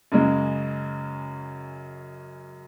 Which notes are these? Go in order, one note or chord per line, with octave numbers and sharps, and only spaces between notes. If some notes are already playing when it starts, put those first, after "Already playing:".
F#2 C#3 G#3